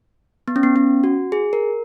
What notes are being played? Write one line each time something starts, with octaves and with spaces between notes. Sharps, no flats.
B3
C#4
B3
C#4
F#4
G#4
A#4